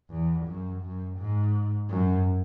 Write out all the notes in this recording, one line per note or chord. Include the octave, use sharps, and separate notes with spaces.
E2
F#2
F#2
G#2
F#2